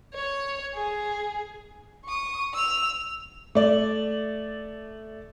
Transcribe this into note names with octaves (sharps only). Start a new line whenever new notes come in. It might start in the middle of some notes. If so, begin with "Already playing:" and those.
C#5
G#4
C#6 D#6
E6 F7
A3 D5